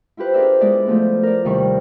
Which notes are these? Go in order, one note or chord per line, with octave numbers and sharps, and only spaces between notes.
E4 F4 G4 B4 C5
D4 F4 G#4 A#4 D5 E5
G#3 B3 E4 D5 D#5
F3 A3 B3
A#4 D5
D#2 C3 D#3 G3 E4 C#6